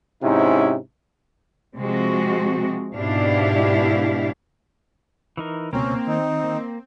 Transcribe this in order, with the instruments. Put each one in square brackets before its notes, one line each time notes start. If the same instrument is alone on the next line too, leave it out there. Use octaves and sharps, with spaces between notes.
[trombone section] G#2 C3 C#4 D#4 E4
[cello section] C3 F3 G#3 C4 F#4
G#2 B2 D4 E4 G4 F5
[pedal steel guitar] E3 D#4 A#4
[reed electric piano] C#2 B2 [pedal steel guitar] A#3 A#4 A#5 [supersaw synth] C4 [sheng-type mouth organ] C#4
[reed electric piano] D#3 [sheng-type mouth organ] D#4
[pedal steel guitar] A#3